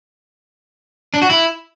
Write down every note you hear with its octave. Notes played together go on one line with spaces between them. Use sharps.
D4
F#4
E4